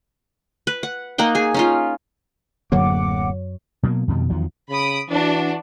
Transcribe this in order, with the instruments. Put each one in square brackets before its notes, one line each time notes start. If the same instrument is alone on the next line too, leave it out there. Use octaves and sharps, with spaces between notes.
[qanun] B4
F#5
A#3 D#4 F#5 G5
G#4 G#5
C#4 D#4 F4
[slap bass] D1 D3 A#3 [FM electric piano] F#2 F#3 C#5 [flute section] F#5 D6
[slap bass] B2 F#3 G#3 A#3
F2 B2 D#3 G3
E2 D#3 F3 F#3
[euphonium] C#3 [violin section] B5 D#6 D7
[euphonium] E3 [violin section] D4 F#4